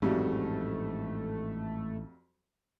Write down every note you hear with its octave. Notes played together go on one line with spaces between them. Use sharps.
A1 F2 G#2 F#3 G3 A3